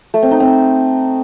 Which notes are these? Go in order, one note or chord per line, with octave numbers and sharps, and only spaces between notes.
A3
C4
D#4
C4